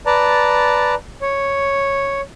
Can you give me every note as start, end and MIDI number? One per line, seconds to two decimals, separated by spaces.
0.06 0.95 71
0.06 0.95 74
0.06 0.95 81
0.06 0.95 82
1.22 2.21 73